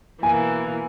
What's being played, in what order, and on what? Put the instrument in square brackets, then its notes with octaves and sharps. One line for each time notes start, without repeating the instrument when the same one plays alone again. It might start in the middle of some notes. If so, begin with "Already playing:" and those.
[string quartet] B2 E3 A#3 [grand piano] G#5